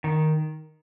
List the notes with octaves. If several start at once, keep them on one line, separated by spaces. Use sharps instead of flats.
D#3